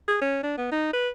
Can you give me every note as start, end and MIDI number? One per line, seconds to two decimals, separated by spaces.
0.08 0.17 68
0.22 0.43 61
0.43 0.53 62
0.58 0.70 59
0.72 0.92 63
0.93 1.09 71